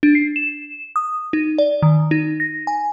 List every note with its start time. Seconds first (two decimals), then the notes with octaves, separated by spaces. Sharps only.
0.03 D4
0.15 C7
0.36 E7
0.96 D#6
1.33 D#4
1.58 D5
1.82 D#3
2.11 D#4
2.40 A#6
2.67 G#5